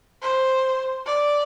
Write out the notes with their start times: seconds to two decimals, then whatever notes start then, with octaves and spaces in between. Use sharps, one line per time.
0.22 C5
1.06 D5